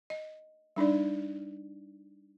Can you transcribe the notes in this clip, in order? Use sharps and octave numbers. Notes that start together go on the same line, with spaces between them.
D#5
G3 D4 D#4 D5